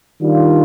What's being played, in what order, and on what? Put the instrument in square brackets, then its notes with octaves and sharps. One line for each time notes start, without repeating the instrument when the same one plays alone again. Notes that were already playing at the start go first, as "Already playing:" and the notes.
[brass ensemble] D#3 G3 D4 F4